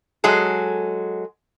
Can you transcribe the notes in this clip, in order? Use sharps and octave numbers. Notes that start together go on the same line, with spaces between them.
F#3 G#3 G#4 A4